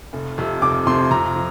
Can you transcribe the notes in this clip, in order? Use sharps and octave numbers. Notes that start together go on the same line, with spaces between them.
F1
F2 C3
F1 D6
F2 C3 C6
F2 A#5
F3